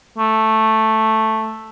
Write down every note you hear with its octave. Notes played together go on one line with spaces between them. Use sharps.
A3